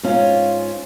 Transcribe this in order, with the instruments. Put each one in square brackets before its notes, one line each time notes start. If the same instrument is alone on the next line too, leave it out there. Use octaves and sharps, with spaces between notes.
[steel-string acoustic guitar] G#2 C#4 F4